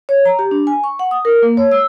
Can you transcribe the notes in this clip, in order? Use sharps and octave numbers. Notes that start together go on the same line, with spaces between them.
C#5
A#5
G4
D4
G#5
C#6
F#5
D#6
A#4
A#3
C#5
E6